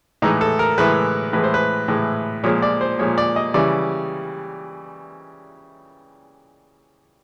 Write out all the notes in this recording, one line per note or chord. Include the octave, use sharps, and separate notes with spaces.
A2 E3 G#3 D#4
A4
A#4
A2 E3 G#3 B4
A2 E3 G#3 B4
C5
B4
A2 E3 G#3
A#2 F3 G#3 C#5
D5
C5
A#2 F3 G#3 C#5
D5
D#5
C#3 E3 G3 D5